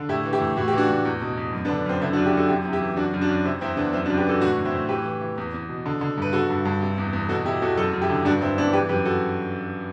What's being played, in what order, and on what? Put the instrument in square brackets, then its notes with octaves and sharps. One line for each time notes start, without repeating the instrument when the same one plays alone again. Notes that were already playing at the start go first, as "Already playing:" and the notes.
Already playing: [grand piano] D3
A2 E4 G4
E3
E4 G4
A2
A2 F#4
G4
E3 D4 F#4
A2
E2
B2
E2
F#2
B3 D4
D3
F#2 C4
D3 C4 E4
D4 F#4
F#2
E4 G4
F#2 F#4 A4
C3 E4 G4
E2
E4 G4
E3
F#2 D4 F#4
F#2
D4 F#4
F#2
C3 C4 E4
E2 C4 E4
C3 B3 D4
F#2 C4 E4
D4 F#4
F#2
G4 B4
E3 F#4 A4
A2 D4 F#4
A2
C4 E4
A2
E3 G4 B4
E3
E3
E2
E2
B2
D3
D3
G2 B4
D3 F#4 A4
G2
G2
C3
E2
E2
B2 F#4 A4
B2 E4 G4
E2 F#4 A4
F#2 F#4 A4
F#2
E4 G4
D3
G2 D4 F#4
G2 C4 E4
E3 B3 D4
E3 G4 B4
F#2 G4 B4
F#4 A4